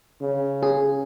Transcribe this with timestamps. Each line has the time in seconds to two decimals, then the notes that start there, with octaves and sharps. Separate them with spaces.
0.21 C#3
0.63 G#4